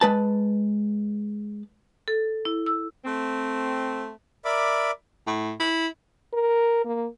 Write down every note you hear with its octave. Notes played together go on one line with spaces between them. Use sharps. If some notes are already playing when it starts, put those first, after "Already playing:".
G#3 B4 A5
A4
E4
E6
A3 C4
A#4 D5 E5 B5 D6
A2
E4
A#4
A#3